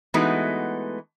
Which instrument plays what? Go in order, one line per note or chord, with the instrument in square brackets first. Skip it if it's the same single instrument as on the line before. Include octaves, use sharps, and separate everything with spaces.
[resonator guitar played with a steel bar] E3 G#3 A3 B3 D#4 F#4